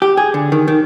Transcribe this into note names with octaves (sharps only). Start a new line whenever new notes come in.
G4
G#4
D3
D#3
D#3